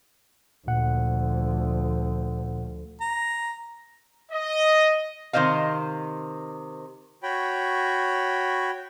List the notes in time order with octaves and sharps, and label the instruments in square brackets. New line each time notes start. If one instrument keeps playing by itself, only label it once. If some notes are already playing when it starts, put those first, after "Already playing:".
[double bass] D2 F3 [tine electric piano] A#2 F#5
[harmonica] A#5
[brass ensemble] D#5
[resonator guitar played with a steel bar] C3 D#3 C5 D#5 F5
[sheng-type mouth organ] F#4 C#5 G5 B5